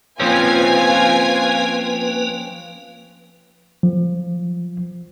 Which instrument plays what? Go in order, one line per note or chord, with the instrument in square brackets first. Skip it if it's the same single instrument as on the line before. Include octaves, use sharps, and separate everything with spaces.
[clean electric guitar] F3 C4 C#4 [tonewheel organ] A#3 B4 [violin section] F4 G#5 G#6
[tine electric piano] F3